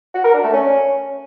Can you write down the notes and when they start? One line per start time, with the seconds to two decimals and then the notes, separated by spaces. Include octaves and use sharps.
0.15 F#4
0.24 A#4
0.34 D4
0.44 A3
0.53 C#4